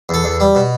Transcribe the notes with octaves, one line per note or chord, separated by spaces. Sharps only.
E2 A4
E2
G3
B2